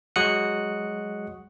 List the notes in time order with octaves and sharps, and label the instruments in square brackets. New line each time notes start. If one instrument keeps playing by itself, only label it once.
[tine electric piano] F#3 G#3 F#4 D#6 F#6 C#7